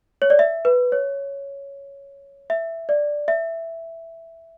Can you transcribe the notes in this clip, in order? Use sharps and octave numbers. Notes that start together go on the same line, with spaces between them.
C#5
D5
E5
B4
C#5
E5
D5
E5